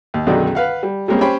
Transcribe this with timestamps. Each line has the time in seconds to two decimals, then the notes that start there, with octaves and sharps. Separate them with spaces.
0.14 D#2
0.27 B1 F#2 D3 D#3 G#4 D5
0.55 B4 F5 F#5
0.83 G3
1.08 G3 G#3 A#3 C4 C#4
1.21 C#4 G4 C5 G5 B5